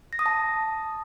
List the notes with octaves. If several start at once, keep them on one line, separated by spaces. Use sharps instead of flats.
A#6
D#6
A5